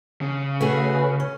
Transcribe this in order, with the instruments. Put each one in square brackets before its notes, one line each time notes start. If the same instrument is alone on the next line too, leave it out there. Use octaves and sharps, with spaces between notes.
[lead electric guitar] C#3
[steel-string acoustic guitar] A3 F#4 G#4 [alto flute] B4
[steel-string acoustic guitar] C#4